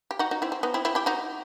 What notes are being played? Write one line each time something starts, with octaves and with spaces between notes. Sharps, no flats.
G4
D#4 F#4
D#4 F#4
C4 E4
C4
B3 D#4
C4 E4
C4 E4
E4 G4
D#4 F#4